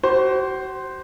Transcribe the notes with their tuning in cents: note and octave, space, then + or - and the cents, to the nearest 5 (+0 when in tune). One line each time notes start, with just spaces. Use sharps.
F#4 +40 C5 +0